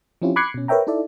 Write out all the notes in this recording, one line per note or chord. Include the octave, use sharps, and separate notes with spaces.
F3 C4 C#4 E4 F4 G4
B5 D6 F#6 G#6 C7 C#7
B2 C#4
A#4 B4 C#5 E5 G5 A#5
D#4 E4 A4 D5 E5